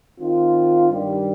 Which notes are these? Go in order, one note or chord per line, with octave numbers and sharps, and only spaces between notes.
D#3 C4 F4
G2 D#3 G3